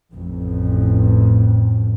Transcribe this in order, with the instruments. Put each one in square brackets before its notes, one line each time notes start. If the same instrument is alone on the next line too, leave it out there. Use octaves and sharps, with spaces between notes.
[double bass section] A1 F2 A2